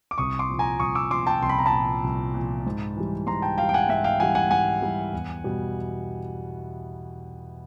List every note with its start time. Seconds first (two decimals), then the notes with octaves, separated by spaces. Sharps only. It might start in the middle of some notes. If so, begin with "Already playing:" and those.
0.11 D6
0.18 C2 C#6 D#6
0.39 C6 D6
0.49 A#2 F3
0.59 G#5 A#5
0.80 C2 C#6 D#6
0.95 D6 E6
1.11 A#2 F3 C6 D6
1.27 G5 A5
1.43 C2 C6
1.49 B5
1.59 A#5
1.66 A5 B5
1.72 A#2 F3
2.04 C2
2.34 A#2 F3
2.66 G#2
2.96 E3 G3
3.27 G#2 A#5 C6
3.42 G5 A5
3.58 E3 G3 F5 G5
3.69 G5
3.74 F#5 G#5
3.89 G#2 E5 F#5
4.04 F5 G5
4.20 E3 G3 F#5 G#5
4.35 F#5 G#5
4.51 G#2 F#5 G#5
4.82 E3 G3
5.12 E2
5.44 B2 G3